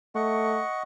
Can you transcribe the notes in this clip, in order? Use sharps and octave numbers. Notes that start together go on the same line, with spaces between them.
A3 D#5 F#5 C#6